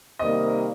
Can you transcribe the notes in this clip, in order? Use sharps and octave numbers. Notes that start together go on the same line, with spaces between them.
C3 D#3 G3 A#3 D#5